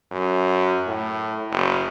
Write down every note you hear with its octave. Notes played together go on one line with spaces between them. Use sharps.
F#2
A2
F#1